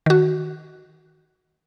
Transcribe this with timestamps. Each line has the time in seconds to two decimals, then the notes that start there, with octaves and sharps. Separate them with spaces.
0.06 D#3 F#4